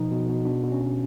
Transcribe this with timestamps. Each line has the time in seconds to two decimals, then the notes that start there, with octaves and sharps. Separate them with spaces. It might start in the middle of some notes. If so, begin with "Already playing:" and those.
Already playing: B2 F3 D#4
0.12 B2
0.29 B2
0.45 B2 D4
0.63 B2
0.72 C#4
0.81 B2